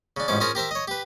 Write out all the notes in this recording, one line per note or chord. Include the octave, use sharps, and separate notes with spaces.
C#3 D4
A1 G#2 F3 C#4 D6
C#4 F4 G#4 A#4 C5
G4 A#4 C5 E5
C#5 D#5
G4 B4